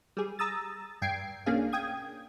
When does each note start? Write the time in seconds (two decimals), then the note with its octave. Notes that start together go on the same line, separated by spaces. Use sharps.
0.17 G3 G#4
0.39 A#5 D#6 E6 A6
1.02 G2 G5 G#6 C7 D7
1.46 B1 A#3 C#4 D4 G#4 F5
1.73 G5 D#6 G#6